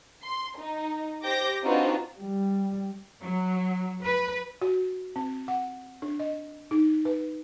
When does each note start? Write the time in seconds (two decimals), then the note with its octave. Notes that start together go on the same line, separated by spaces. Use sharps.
0.23 C6
0.58 D#4
1.22 G4 C5 D6 G6 A#6
1.64 C4 D4 D#4 F4 F#4 B4
2.17 G3
3.22 F#3
4.04 B4
4.61 F#4
5.16 C4
5.48 F#5
6.02 D4
6.19 D#5
6.71 D#4
7.05 B4